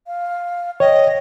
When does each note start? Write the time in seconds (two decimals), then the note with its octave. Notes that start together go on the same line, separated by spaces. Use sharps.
0.07 F5
0.80 C#5 D#5 G5